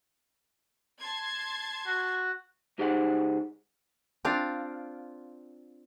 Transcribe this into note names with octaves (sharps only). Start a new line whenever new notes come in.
A5 C6 G#6
F#4
C#2 D#4 G4 G#4 C5 F#5
C4 D4 F4 F5